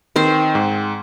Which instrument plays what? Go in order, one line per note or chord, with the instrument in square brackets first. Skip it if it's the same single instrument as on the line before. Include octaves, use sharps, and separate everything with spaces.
[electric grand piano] D#3 [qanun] C4 C5
[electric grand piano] G#2